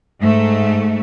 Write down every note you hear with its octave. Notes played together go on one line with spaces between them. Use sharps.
G#2 A3